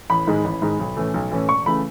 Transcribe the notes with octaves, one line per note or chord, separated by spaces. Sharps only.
A1 B5
G#2 D#3 G#3
A1
G#2 D#3 G#3
B1
A2 E3 A3 C#4
B1
A2 E3 A3 C#4
E1 C#6
C#3 E3 A3 B5